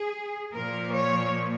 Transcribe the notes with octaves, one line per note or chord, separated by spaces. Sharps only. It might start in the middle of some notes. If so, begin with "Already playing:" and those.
Already playing: G#4
A#2 F3 A#3 A#4
C#5